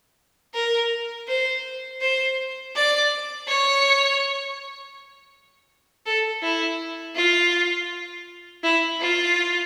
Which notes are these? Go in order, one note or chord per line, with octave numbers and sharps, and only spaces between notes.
A#4
C5
C5
D5
C#5
A4
E4
F4
E4
F4